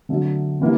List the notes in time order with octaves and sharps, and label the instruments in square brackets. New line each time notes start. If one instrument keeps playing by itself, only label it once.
[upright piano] D3 F#3 A3
C#3 E3 G3 A#3